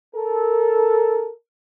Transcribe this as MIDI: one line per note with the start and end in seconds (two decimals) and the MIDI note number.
0.16 1.31 69
0.16 1.31 70